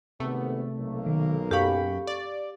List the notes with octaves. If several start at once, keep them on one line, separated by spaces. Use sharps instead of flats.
G#1 C3 A3 B3
B1 A#3
D#3
F#2 G4 A4 F5 G5 B5 C#6
D5